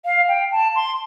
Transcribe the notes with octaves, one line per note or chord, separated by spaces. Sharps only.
F5
G5
A5
C6